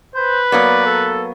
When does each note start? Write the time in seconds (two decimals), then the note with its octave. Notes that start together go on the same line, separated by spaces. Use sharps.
0.15 B4 C5
0.52 F#3 A#3 B3 D5
0.86 A4